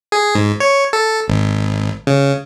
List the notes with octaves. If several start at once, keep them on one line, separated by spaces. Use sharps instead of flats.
G#4
G#2
C#5
A4
G#1
C#3